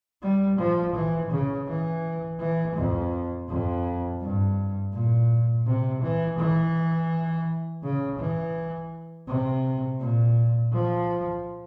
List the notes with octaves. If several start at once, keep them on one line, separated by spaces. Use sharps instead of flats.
G3
F3
E3
C#3
E3
E3
F2
F2
G2
A#2
C3
E3
E3
C#3
E3
C3
A#2
F3